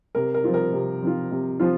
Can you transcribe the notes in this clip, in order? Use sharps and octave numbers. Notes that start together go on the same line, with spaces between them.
C3 A#4
A#4
F3 C4 F4
A#4
C3
F3 C4 F4
C3
F3 C4 F4